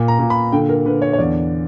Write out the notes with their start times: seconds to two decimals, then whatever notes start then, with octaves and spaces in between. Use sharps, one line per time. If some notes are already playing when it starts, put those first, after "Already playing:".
Already playing: A#2
0.08 A#5
0.19 A#2
0.30 B5
0.52 D3 G5
0.69 A#4
0.86 D3 B4
1.02 C#5
1.13 C#5
1.18 E2 D5